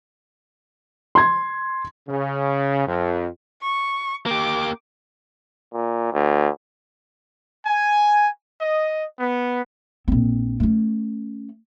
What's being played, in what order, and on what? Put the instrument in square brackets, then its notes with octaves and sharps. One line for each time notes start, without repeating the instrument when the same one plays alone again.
[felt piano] C6 G#6
[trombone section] C#3
F2
[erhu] C#6
[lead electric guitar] A#3 G4 [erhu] D6
[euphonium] A#2
D2
[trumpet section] G#5
D#5
B3
[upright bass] A#1 C4
A3 C#4